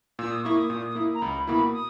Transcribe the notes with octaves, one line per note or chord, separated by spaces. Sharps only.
A#2 E6
D#6
A#3 E4 C#6
D#6
A#2
A#3 E4
A#5
C#2 B5
B2 A#3 E4 B5
D#6